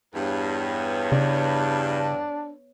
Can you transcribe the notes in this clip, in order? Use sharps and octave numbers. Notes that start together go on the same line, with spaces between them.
E2 G2 B3 C#5
C#3 D4